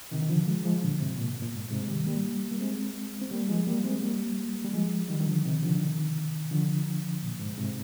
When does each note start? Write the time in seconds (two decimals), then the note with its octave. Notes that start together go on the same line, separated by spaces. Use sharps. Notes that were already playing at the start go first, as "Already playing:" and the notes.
0.11 C3 D#3
0.22 D#3
0.29 D3 F3
0.47 F3 G#3
0.65 F3 G#3
0.82 A#2 D3
1.00 G#2 C3
1.18 A#2
1.30 G#2
1.42 A#2
1.53 G#2
1.71 G#2 C3
1.82 G#3
1.89 D#3 G3
2.06 G3 A#3
2.52 A#3
2.60 G#3 C4
3.22 C4
3.31 G3 A#3
3.48 F3 G#3
3.67 G3 A#3
3.84 G#3 C4
4.02 G3 A#3
4.64 G3
4.73 F3 G#3
5.08 D#3 G3
5.20 D#3
5.26 D3 F3
5.44 C3 D#3
5.62 D3 F3
5.75 D3
5.80 C3 D#3
6.51 D3 F3
7.23 A#2
7.39 G#2
7.57 G#2 C3